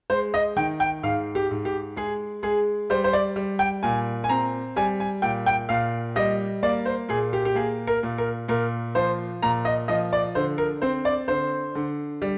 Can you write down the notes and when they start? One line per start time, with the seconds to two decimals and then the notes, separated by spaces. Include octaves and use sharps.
0.10 G#3 C5
0.34 D#5
0.56 D#3 G5
0.80 G5
1.03 G#2 F5
1.35 G4
1.51 G#2
1.65 G4
1.97 G#3 G#4
2.43 G#3 G#4
2.90 G3 C5
3.04 C5
3.13 D5
3.36 G3
3.59 G5
3.83 A#2 G#5
4.24 G#5
4.29 C4 A#5
4.76 G3 G#5
5.00 G#5
5.22 A#2 G5
5.46 G5
5.69 A#2 F5
6.16 G3 D#5
6.63 A#3 D5
6.86 C5
7.09 A#2 G#4
7.33 G4
7.45 G4
7.55 A#3 G#4
7.87 A#4
8.03 A#2
8.18 A#4
8.48 A#2 A#4
8.95 F3 C5
9.42 A#2 A#5
9.65 D#5
9.88 F3 D#5
10.13 D5
10.35 D3 C5
10.58 A#4
10.82 C4 C5
11.05 D5
11.28 D3 C5
11.75 D3
12.22 G3